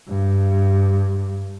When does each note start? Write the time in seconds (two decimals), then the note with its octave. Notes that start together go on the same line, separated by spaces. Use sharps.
0.08 G2